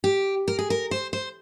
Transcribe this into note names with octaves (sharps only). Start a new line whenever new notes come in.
G4
A#4
G#4
A#4
C5
C5